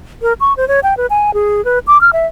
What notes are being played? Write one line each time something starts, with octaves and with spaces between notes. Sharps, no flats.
A#4
C#6
C5
C#5
G5
B4
G#5
G#4
B4
D6
F6
E5